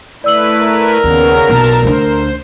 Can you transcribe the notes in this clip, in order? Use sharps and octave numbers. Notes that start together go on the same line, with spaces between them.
A3 E4 B4 D5 E6 F#7
A#4
D#2 C#3 B3 C#4
B1 A5
D2 D3 C5